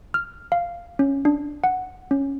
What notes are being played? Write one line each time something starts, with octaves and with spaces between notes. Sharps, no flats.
F6
F5
C#4
D4
F#5
C#4